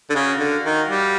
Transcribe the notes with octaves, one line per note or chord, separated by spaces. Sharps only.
D3
C#3 F#4 A#4 D5 F5
D3
D#3
G3